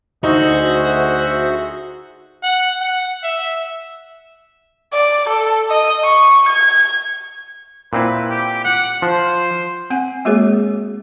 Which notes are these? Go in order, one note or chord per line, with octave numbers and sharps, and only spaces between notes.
D2 D#4 F#4 G#4 C5 E5
F#5
F#5
E5
D5
A4
D#5
C#6
G#6
A#2 C4 E4 B4
G4
F#5
F3 C5
C4 F#5 G#5
G#3 A#3 F#4 G#4 A#4 C#5